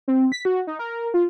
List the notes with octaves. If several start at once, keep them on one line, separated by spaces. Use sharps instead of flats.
C4
B6
F#4
D#4
A#4
F4